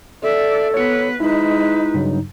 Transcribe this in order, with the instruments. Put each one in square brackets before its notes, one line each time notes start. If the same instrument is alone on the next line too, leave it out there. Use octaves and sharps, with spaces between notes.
[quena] A4 [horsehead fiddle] D5 E5
[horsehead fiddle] B3 B4 [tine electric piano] C#5 C#7
[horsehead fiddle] G#3 B4 [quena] D#4 [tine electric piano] E4
[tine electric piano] G2 C#3 F#3